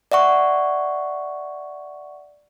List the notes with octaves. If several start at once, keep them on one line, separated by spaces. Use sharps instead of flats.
D5 E5 F#5 C#6